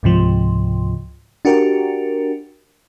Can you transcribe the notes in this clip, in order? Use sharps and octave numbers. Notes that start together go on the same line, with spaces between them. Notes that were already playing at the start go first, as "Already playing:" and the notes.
C#2 G#2 C3 F3
D4 F#4 G4 A#4